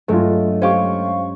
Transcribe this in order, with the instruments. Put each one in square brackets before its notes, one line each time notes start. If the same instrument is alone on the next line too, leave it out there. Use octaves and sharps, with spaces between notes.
[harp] G2 F#3 G#3 [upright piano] A3 F4
[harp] C#4 G4 [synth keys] C5 F5 C#6